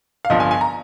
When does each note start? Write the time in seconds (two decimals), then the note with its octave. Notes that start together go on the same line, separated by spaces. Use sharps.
0.25 F5
0.30 G1 G2 F3 D#5
0.40 G#5
0.51 G#5
0.61 A#5